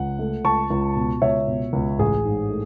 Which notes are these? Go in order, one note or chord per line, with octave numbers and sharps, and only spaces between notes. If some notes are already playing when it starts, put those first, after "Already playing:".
Already playing: C#2 F#5
A3
C#2 A5 C#6
C#2
B2
C#2 C#5 E5
B2
C#2
A1 G#4
G#2
A3